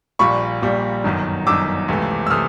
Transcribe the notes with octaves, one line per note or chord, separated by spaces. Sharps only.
A#1 A#2 G3 B5 C#6
A#1 A#2 G3
G1 F#2 D#3
G1 F#2 D#3 D6 E6
C#2 C3 E3 A3
E6
C3 E3 A3 D#6 F6